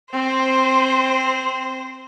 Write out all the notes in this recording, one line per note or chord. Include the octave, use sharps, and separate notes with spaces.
C4 C5